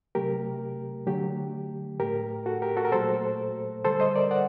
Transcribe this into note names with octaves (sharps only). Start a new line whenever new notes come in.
C3 F#3 A3 G4 A#4
D3 F#3 A3 G4
A2 A3 G4 A#4
F#4 A4
G4 A#4
F#4 A4
A#4
A#2 F#3 A3 A4 C5
D3 G3 A4 C5
C5 D#5
A#4 D5
D5 F#5